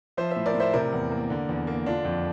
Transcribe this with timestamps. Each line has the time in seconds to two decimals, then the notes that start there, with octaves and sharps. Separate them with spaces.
0.17 F3 C5 E5
0.31 A2 C5 E5
0.46 A#4 D5
0.54 A2
0.60 C5 E5
0.73 C3 A#4 D5
0.93 E2
1.11 A#3
1.30 D3
1.49 E2
1.67 A#3
1.86 D3 D4 F4
2.05 F2